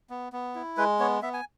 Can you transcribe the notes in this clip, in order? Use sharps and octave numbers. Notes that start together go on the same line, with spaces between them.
B3
B3
E4
G#3 B4
B3 C#5
B3 E5
G#5